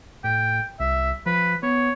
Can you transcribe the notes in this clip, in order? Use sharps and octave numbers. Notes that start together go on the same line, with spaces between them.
A2 G5
C2 E5
F3 B4
B3 C#5